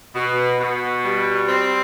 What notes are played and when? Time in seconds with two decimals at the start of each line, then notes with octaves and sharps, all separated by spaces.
0.14 B2
0.59 B2
1.04 G3
1.47 C4